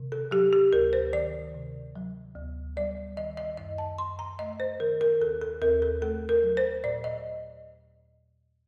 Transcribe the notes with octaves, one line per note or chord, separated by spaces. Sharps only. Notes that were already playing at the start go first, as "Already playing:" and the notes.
Already playing: C3 D#3
A4
F#3 G4
G4
D2 A#4
C5
D#3 D5
C3
F#3
D2
G3 D5
D#3 D#5
D#5
F#2 D#5
A5
F#2 C6
A#5
A3 D#5
C5
D#3 A#4
A#4
D#2 A4
A4
D#2 A#4
A4
A3 A4
A#4
F#3
C5
A#2 D5
D#5